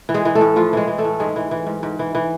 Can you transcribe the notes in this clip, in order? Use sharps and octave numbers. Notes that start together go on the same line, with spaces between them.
E3
G#3 G#4
E3
A3 A4
A2
A2 F3 F4
E3 G#3 G#4
E3
A3 A4
A2
G#2 G#3 G#4
E3
E3
G#2
G#2
E3
E3